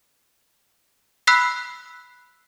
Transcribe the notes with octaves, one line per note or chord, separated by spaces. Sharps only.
B5 E6 F#6 B6 C7